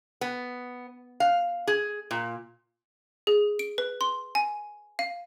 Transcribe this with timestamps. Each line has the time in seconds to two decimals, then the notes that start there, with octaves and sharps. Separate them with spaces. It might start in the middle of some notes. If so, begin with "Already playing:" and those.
0.21 B3
1.20 F5
1.67 G#4
2.11 A#2
3.27 G#4
3.59 D7
3.78 B4
4.01 C6
4.35 G#5
4.99 F5